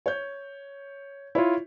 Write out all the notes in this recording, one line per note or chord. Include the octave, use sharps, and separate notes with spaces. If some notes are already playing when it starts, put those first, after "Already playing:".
C#5 G6
E4 F4 C#5